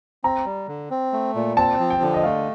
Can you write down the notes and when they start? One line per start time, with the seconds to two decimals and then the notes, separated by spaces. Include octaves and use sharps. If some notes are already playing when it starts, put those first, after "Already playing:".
0.24 C4 A#5
0.46 G3
0.68 D3
0.91 C4
1.13 A3
1.35 A#2
1.57 C4 A5
1.79 F3
1.90 G5
2.02 D3
2.14 D#5
2.23 A3 F5